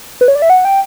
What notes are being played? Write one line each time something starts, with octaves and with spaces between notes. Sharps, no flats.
B4
C#5
D5
E5
F#5
G5